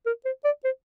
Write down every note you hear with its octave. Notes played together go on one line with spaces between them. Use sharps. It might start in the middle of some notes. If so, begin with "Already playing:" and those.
A#4
C5
D5
C5